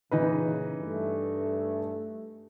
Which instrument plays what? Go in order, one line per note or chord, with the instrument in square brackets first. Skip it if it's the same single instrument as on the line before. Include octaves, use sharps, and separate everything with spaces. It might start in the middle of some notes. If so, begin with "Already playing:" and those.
[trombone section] A#2 C#3 [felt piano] E3 D#4 B4
[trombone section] G2 A3